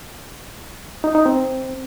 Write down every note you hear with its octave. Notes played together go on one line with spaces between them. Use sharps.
D#4
D#4
C4